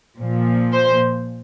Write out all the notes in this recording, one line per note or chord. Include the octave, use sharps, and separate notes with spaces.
A#2 F3
C5